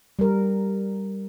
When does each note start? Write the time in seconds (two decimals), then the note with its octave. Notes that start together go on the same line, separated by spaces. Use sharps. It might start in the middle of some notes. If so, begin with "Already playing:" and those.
0.19 G3 A#4